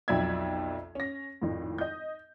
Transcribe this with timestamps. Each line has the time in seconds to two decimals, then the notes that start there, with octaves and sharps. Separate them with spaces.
0.08 B1 F2 F#3 D5 E5 G#6
0.95 C#4 A#6
1.42 G#1 F2 A2
1.78 D#5 G6